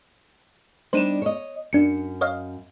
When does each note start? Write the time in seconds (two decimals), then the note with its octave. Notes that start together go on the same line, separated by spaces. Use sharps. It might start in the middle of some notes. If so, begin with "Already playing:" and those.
0.93 G3 D4 D#4 C5 D#7 E7
1.22 C#5 D#5
1.73 F#2 D4 C#7
2.21 C#5 D#5 F5